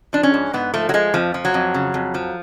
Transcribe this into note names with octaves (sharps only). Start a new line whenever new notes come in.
F3 D4
C#4
G#2
G#2 B3
F3 A3
F#3
F3 G#3
F2 F3
F3
F#3
F2
C#3
F2
F3